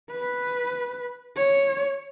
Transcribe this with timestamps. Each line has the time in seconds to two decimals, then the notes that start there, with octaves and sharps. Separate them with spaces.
0.11 B4
1.37 C#5